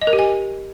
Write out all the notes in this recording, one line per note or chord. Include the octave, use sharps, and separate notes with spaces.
D#5
A#4
G4
G#5